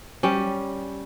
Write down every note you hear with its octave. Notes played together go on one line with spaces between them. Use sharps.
G3 C#4